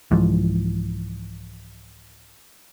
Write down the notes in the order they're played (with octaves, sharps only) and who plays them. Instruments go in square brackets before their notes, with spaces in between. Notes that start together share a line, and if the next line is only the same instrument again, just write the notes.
[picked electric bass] C2 G#2 E3 F3